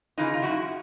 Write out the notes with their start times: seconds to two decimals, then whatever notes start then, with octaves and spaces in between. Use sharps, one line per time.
0.18 C#3 E3 D#4 F4
0.34 F4
0.42 F#2 E4 F#4